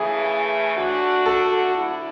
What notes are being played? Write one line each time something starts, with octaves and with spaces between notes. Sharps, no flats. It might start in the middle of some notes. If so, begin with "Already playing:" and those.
Already playing: C#3 E3 A3 G#4
D3 A3 D4 F#4
A4
D2 D3 A3 E4